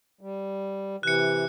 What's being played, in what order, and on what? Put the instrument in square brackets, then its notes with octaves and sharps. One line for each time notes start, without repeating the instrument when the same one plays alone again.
[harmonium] G3
[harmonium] C3 E3 [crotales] F#6 C#7